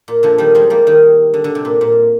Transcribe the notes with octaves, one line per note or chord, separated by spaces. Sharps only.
A#2
D3 F3
D#3 G3
F3 G#3
G3 A#3
D#3
D3
D3
C3
A#2
A#2